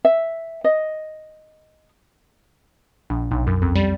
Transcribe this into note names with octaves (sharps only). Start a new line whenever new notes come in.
E5
D#5
A#1
B1
F#2
F2
G3